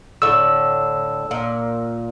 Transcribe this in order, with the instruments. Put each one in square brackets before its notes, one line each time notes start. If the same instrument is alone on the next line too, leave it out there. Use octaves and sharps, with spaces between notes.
[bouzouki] A2 D3 [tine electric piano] E6
[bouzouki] A#2